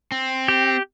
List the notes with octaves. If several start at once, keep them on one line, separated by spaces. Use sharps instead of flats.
C4
G4